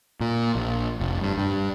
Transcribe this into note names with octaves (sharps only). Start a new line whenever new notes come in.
A#2
A#1
F1
G2
G2